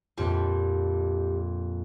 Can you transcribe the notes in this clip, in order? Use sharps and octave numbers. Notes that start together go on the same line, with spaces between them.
A#1 F2 G3 F4